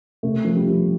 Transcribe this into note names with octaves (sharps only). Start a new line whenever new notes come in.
C3 A3
F3
G3
F3